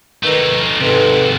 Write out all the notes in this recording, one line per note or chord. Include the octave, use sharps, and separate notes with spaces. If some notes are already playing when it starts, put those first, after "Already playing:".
D#3 A3 D#4 B4
G#2 C3 D#4 A4 B4